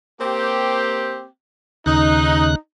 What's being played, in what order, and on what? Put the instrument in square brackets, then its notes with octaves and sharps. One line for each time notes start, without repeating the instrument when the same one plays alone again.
[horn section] A#3 C4 G4
[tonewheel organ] D#2 C#3 F#6 [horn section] D#4